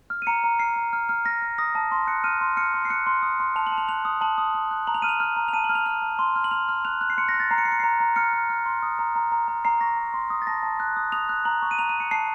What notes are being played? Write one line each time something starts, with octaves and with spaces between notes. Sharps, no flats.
F6
D#7
A#5 C#7
A#5
F6 C7
A#5
F6
F6
F6 A#6
F6
D#6 A#6
A5
C6
F#6 C#7
F6 D#7
C6
F6 C#7
C6
C7
F#6 C#7
C6
D#6
C6
A5 F7
F#7
A5
F7
F#6 F7
D#6
A5 F#7
D#6
D#6
F#6
A#5 F#7
F7
F6 D#7
F7
F6
A#5
F7
A5 D#7
F#7
F6
F7
F6 F7
A5
C6
F6
F#7
F6 F7
F6
F#6 F7
F#6
C7
C6 C#7
A#6
F#6
A6
A#5 C7
C#7
A#5 C7
C#7
A#5 C7
A#5
F6 C#7
F6
F6
C6
D#6
A#5
A#5
A#5
A#5
A#5 C7
C#6 A#6
A#5
C6
D#6
A6
A5 A#6
A5
F#6
D#6
D#6 F7
F#6
A#5 F#7
C#6
D#7
A#5 F7
D#7
A#5
C#7
A5 C7